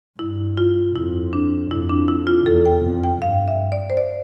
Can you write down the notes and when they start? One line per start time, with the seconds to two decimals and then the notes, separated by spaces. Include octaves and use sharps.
0.19 G2 E4
0.57 F4
0.95 F2 E4
1.33 D4
1.70 F2 E4
1.90 D4
2.08 E4
2.27 F4
2.46 E2 A4
2.66 G5
2.84 F2
3.04 G5
3.22 G2 F5
3.48 E5
3.72 D5
3.90 C5
3.97 D5